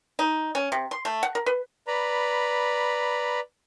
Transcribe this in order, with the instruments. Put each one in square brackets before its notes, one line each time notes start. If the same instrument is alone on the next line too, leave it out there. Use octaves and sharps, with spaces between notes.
[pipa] D#4
C#4
C3
C6
A3
F#5
A#4
B4
[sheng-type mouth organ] B4 D5 A#5 B5